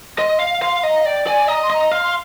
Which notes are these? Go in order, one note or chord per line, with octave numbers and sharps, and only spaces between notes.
D#5 C6
F5
F5 C6
D#5 A#5
F5
D5 G5
D5 G#5
D#5 A#5
C6
D#5 A#5
F5 C6
C6